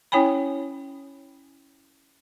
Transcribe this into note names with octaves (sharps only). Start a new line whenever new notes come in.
C#4 E4 C#5 G5 G#5 B5